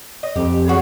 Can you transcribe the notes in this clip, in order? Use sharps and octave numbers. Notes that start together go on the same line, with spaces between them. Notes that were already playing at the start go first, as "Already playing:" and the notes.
D#5
F2 G4
G#3 F#4 C#5